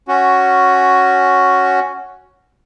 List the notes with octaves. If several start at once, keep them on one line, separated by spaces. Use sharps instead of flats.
C#4 F#4